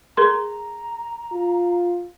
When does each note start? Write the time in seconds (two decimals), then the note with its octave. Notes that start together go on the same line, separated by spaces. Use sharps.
0.17 G#4 A#4 A#5 C6
1.32 F4